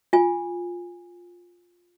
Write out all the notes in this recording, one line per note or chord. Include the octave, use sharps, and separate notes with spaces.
F4 G#5